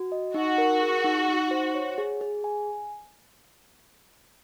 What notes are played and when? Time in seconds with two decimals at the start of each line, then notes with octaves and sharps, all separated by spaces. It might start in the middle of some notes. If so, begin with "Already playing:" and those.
Already playing: F#4
0.12 D#5
0.34 D#4 F#4
0.58 A#4
0.82 G#4
1.04 D#4
1.28 D#4
1.51 C5
1.75 C#5
1.98 G#4
2.21 G#4
2.44 G#5